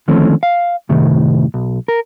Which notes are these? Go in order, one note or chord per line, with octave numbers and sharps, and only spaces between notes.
D3 D#3 F3 A3 C4 C#4
F5
F#2 A2 C3 D#3
B1
A#4